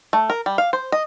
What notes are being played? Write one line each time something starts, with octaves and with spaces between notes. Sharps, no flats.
A3
A#4
G3
F5
C5
D#5